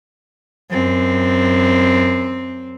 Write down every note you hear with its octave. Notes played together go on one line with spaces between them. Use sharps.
F#2 C4